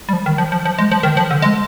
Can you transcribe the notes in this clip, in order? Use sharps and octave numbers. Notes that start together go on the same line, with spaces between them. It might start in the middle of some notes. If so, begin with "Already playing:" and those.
G3
F3
D#3
F3
F3
F3
G#3
F3
D#3
F3
D3
G#3